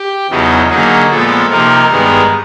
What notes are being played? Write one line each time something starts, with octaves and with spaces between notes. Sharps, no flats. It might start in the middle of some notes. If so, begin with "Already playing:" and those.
Already playing: G4
E2 C#3 F#3 B3 D#4
D3 F#3 A#3 D#4 G#4
A#2 F3 G#3 B3 A4
C3 F3 A#3 D#4 A#4
G2 D#3 G#3 B3